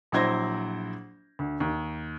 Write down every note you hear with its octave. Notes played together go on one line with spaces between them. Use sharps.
A#1 F#3 E4 C5 G#6 A#6
D2
D#2